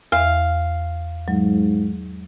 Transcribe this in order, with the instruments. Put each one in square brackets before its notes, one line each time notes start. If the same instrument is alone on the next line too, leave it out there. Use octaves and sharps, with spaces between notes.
[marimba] E2 E5 [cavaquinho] F5
[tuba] G#2 [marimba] F#3